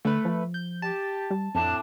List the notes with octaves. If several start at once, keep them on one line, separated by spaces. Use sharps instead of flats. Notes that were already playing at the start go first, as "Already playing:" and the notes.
D3 A3 B4
F3
G6
G4 A5
G3
F2 A2 C4 D4 A5